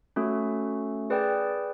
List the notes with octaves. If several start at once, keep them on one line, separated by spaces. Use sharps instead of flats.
A3 C#4 F#4 A4
G#4 B4 D5 G5